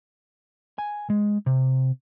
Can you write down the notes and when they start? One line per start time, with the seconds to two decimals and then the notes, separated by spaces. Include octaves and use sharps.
0.78 G#5
1.10 G#3
1.46 C3